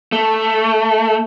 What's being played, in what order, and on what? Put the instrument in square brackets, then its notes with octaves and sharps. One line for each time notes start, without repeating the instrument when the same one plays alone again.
[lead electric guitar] A3